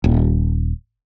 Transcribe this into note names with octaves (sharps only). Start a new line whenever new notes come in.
D#1